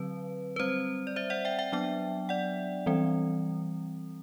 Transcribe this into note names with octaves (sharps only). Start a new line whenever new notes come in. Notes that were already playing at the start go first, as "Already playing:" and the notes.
Already playing: D3 F#3 C4 B4
B4
G3 C4 C5
D5
C5 E5
D5 F#5
E5 G5
E5 G5
F#3 B3 D4 E5 G5
D5 F#5
E3 G3 C4